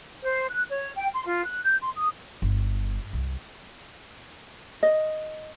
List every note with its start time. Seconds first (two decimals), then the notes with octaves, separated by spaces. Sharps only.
0.23 C5
0.50 F#6
0.69 C#5
0.96 G5
1.14 C6
1.26 F4
1.45 F#6
1.64 G6
1.82 C6
1.95 D#6
2.42 G1
3.13 C2
4.83 D#5